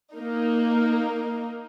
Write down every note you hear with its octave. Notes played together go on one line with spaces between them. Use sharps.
A#3 D#4